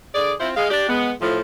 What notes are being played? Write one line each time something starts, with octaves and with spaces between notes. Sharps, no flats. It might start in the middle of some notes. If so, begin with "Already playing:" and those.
D3 G#4 D5
C4 E4 F4 C5
G#3 F5
D4 G4
G#3 B3
A2 F3